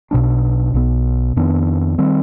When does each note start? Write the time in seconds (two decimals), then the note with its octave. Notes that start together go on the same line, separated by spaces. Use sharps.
0.11 B1 B2 G#3 D4
0.74 B1 B2 B3
1.36 F2 D#3 B3 D4
1.98 D#3 G3 C4